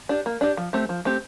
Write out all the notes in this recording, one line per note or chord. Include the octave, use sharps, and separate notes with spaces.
D4 G4
A#3
D4 G4
F3
A3 C4 G4
F3
A3 C4 G4